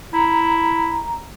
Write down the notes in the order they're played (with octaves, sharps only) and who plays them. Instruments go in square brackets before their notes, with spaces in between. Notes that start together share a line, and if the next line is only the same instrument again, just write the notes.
[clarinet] E4 [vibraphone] A#5